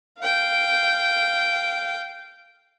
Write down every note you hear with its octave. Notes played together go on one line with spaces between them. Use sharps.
F5 G5